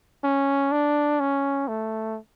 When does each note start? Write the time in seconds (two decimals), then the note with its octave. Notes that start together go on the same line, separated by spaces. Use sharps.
0.24 C#4
0.72 D4
1.20 C#4
1.68 A3